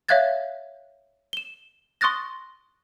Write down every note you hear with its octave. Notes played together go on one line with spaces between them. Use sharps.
C#5 E5 F5 F#6 G#6 A6
E7 G7
C6 C#6 D#6 F#6 A6 A#6